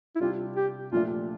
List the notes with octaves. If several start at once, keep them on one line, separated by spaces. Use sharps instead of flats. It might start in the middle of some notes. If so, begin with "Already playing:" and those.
E4
C3 G3 D4 F4 G4
G4
A#2 F3 A3 D4 F4